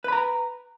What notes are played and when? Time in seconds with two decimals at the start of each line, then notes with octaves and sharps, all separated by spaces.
0.04 B4
0.08 B5
0.12 A#5